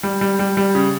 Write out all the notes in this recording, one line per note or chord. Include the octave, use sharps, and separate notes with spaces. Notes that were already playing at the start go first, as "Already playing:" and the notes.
G3
G3
G3
G3
C#3